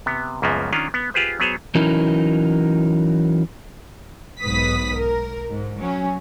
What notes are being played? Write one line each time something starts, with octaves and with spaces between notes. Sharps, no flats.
C3 B3
C#2 F#2 C#3 F3 A#3 B3
D#3 C#4 D4 F4
B3
F4 G4 G#4 B4 C5
F#3 B3 G#4 C5 C#5
E3 F#3 C#4 D#4 E4 A#4
B1 G#2 B4 D#6 B6
A#4
G#2
F#3 C#4